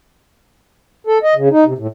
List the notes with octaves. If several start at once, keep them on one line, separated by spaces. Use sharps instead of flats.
A4
D#5
C#3
D#4
C3
A2